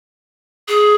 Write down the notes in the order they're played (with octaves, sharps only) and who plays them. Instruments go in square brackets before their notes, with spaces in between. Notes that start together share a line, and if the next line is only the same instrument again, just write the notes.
[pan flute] G#4